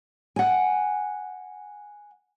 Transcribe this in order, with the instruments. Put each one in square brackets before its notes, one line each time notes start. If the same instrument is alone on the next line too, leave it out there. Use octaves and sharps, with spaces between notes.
[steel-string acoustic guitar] F#5 G#5